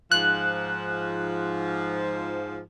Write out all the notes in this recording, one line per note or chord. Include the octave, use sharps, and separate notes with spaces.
G#2 F3 F#6